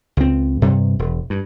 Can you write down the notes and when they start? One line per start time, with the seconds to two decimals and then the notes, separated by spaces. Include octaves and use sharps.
0.17 C#2 C4
0.62 G2 C3 G3
0.99 E1
1.30 G2